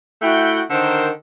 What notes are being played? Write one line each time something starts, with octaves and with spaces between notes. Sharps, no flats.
A3 E4 F#4 F#5 G5
D3 D#3 A#4 C5